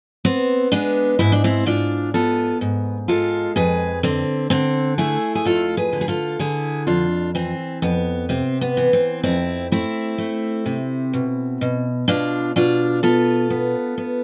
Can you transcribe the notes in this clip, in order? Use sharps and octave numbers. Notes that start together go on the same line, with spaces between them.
B3 C4
G#3 B3 D4
G#2 E4
D4
C4 E4
G#2 D4 F4
B3 F4 A4
G#2
G#3 F4 A4
F2 G#4 B4
D3 C4
D3 C4
A3 E4 G#4
G#4
F2 F4 A4
G#4 B4
D3
G#4
F4 A4
D3 E4 G#4
F2 D4 F4
E3 C4
F2 B3
C3 C4
B3
E3
C4
F2 C4 E4
A3 C4 E4
A3
C3
B2
B2
B2 D4 F4
B2 D4 F4
B3 F4 A4
B3
B3